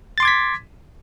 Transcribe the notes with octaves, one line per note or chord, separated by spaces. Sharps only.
C6 D6 G#6 A6 B6